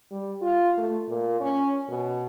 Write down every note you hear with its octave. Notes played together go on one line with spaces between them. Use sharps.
G3
F4
A3
A#2
C#4
B2